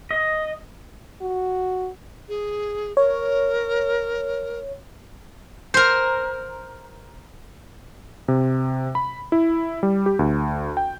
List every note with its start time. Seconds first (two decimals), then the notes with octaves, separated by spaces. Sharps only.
0.11 D#5
1.21 F#4
2.29 G#4
2.97 A#4 C#5
5.74 A#4 C5
8.28 C3
8.95 B5
9.32 E4
9.83 G3
10.06 G4
10.19 D2
10.77 G5